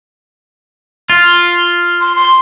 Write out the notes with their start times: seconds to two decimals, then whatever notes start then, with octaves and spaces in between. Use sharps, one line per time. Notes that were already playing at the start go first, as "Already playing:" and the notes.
1.10 F4
2.01 C6
2.16 C6